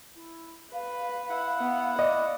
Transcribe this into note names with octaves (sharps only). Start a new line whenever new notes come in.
E4
B4 F5
E4 F#5
B3
D5 D#5